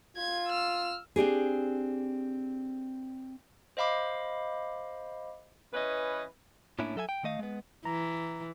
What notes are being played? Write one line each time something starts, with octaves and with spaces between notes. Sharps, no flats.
F4 G#6
E6 F6
C4 D4 G4 G#4
C5 D#5 F5 B5 D6
E3 C#4 B4 D#5
A2 A#3 C#4 D4 E4
F#3 A4 E5 F#5 G#5
G5
D#3 A3 D#5 F5
G#3 B3
E3 A#5